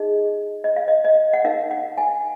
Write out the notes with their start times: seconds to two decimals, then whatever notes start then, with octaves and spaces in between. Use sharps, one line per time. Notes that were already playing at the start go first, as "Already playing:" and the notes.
Already playing: D#4 G#4 D#5
0.64 D#5
0.76 F5
0.88 D#5
1.05 D#5
1.33 F#5
1.45 D#4 A#4 F5
1.71 F#5
1.98 G#5